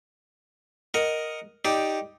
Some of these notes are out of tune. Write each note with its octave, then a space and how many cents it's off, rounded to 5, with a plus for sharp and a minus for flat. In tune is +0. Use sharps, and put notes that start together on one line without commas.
A#4 +5 D#5 +0 F#5 +0
D#4 +5 G4 +0 D5 +0